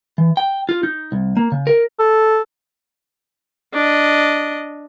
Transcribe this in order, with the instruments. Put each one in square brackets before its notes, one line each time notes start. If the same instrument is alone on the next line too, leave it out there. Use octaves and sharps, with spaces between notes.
[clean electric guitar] E3
G5
F4
D#4
C2
A#3
C#3
A#4
[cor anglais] A4
[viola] D4 D#5